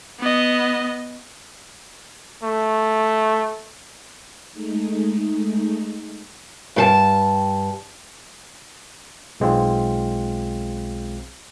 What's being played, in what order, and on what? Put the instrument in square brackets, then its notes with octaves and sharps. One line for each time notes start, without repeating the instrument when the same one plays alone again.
[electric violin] B3 D#5
[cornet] A3
[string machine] G#3 A3 D#4
[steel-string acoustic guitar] G2 A4 A5
[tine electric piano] B1 G#3 C4 F4